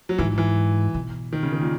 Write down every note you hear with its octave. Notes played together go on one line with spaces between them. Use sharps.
F#3
G#2 E3
E3
B2
D#3
C#3
D#3
A#2